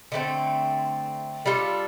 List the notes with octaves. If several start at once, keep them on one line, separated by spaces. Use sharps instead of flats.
D3 A3 C4
G3 D4 F4 A4